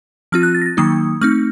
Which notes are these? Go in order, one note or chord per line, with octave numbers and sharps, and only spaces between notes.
F3 C4 F4 F6
F#6
A6
A#6
A6
D#3 F#3 A#3 D#4 D#6
A3 C4 D#4 F6